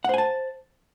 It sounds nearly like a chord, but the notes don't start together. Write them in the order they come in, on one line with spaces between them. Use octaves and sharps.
F#5 C5 G#5 A5